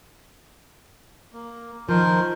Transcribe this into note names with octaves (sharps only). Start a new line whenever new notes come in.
A#3
D#3 F3 A#4 C5